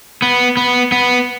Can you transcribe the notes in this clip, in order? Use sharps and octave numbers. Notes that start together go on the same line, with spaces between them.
B3
B3
B3